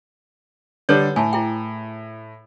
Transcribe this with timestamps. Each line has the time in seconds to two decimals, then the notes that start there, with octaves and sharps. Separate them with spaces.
0.89 D3 G3 D4 A4 B4 C#5
1.16 A2 G#5 A5
1.33 E4 G#4 G5